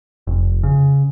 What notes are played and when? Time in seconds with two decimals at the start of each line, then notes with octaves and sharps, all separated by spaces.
0.27 F1
0.63 C#3